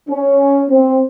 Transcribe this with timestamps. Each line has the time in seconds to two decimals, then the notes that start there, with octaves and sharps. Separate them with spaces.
0.09 C#4
0.70 C4